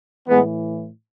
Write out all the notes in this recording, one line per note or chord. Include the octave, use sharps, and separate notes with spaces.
A2 E3 G#3 B3